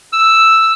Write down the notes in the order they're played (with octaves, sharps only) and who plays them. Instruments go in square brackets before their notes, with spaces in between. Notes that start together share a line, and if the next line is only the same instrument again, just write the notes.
[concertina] E6